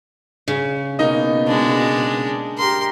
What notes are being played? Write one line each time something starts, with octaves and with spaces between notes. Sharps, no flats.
C#3
B2 A#3 D#4 D#5
G#3 D4
G4 A#4 C6